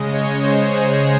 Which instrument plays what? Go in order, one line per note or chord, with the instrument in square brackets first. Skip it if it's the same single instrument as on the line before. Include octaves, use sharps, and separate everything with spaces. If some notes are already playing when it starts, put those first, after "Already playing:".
Already playing: [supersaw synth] C#3 G#3 D#5
C#5
C5
G#4